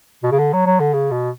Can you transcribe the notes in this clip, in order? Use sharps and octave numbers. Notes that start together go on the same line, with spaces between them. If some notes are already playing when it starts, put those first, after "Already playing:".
B2
C#3
D3
F#3
F#3
D3
C#3
B2